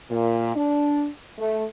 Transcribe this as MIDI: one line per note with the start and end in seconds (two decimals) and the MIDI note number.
0.11 0.56 46
0.56 1.09 62
1.38 1.64 57